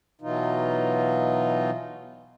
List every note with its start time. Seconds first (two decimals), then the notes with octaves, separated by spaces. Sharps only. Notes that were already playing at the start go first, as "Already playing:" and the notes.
0.21 B2 E3 F#3 D#4 F4